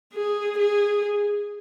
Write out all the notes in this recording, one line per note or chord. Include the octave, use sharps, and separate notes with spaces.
G#4
G#4